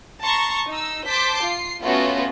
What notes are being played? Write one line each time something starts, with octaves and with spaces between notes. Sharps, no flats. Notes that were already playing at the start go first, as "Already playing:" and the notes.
A5 A#5 C6 C#6
D#4 E6
C5 A5 D6 G6 B6
F4 C7
A3 B3 C#4 F4 F#4